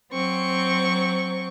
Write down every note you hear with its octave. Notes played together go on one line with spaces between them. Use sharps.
F#3 C4 C#6